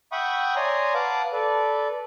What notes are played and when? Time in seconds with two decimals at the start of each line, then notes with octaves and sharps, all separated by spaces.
0.12 E5 F#5 G5 B5 C#6 D#6
0.56 C#5 D5 G#5 A#5 C6 D#6
0.94 B4 F5 F#5 A5 D6
1.33 A4 B4 D5